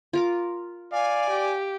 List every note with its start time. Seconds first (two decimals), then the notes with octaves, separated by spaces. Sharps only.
0.13 F4 A#4 D6
0.93 D5 F5 G#5
1.30 G4